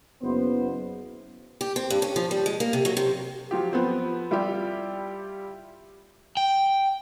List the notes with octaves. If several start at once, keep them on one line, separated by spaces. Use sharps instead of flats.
F#1 B3 C5
G4
C4
G2
C#4
F3
G3
G#3
A#3
C3
F#3
C3
F3 F#3 F4 G4
F3 B3 C4
G3 E4 F4 G4
G5